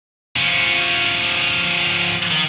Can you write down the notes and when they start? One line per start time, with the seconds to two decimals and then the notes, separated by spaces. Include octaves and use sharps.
0.36 F3 C#4
2.31 D#3